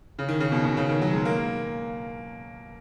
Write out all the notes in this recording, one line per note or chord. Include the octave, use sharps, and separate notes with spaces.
C#3
D#3
C#3
B2
B2
C#3
D#3
F#3
G#3
A#3